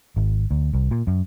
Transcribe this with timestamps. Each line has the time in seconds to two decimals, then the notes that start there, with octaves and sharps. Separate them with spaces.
0.16 G#1
0.51 D2
0.73 C2
0.91 A#2
1.07 F#2